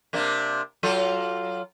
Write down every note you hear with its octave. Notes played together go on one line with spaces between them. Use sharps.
C3 A#3 D4
F#3 F4 A4